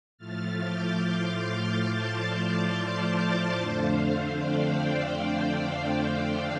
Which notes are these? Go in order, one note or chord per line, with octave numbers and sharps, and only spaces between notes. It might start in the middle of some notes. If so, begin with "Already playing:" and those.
A2 F3 A3 F6 A6
D6 G6
C6 F6
A5 D6
D5
D5
C5
D5
F2 D3 A3 D4 C5 F5
D5 G5
D5 G5
C5 F5